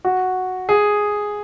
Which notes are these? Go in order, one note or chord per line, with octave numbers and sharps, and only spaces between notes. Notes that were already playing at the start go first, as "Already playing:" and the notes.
F#4
G#4